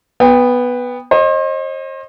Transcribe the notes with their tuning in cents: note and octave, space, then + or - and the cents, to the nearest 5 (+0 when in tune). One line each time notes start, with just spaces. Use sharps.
B3 +0 G5 +30
C5 +40 D#5 -5